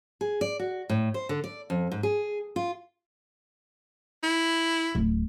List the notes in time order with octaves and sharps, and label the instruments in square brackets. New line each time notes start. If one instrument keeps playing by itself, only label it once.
[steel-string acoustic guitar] G#4
D5
F#4
A2
C5
D3
D5
F2
G#2
G#4
F4
[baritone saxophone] E4
[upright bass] D1